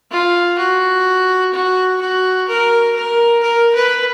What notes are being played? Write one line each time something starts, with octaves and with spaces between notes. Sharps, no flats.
F4
F#4
F#4
F#4
A#4
A#4
A#4
B4